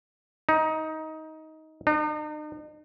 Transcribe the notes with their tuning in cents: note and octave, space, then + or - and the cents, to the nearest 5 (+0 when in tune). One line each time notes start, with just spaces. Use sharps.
D#4 +15
D#4 -45